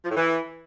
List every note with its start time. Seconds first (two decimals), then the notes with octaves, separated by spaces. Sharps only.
0.05 F3
0.10 A2
0.16 E3